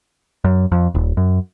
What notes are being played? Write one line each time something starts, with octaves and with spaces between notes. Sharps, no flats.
F#2
F2
D#1
F#2